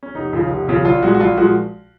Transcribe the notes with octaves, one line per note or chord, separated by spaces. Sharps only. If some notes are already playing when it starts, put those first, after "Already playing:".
C#4
F1 D#4
D#2 C#3 F3
F1
D#2 C#3 F3
A#1 F4
A#2 F3 G#3 F#4
F#4
A#1 F4
A#2 F3 G#3 F#4